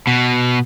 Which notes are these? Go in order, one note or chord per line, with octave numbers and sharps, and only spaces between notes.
B2